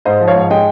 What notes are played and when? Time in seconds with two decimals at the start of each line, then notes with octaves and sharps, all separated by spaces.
0.05 G#2 C5 D#5
0.20 F3
0.28 C#5 F5
0.36 G#2
0.50 G#3 D#5 G5